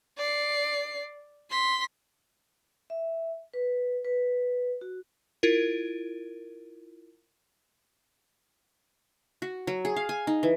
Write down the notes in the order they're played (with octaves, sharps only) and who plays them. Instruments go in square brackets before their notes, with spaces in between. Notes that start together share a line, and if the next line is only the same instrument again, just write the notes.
[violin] D5 C7
C6 B6
[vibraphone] E5
B4
B4
F#4
[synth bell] E4 F4 A#4
[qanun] F#4
F#3
G#4
F5
G#5
D#4
E3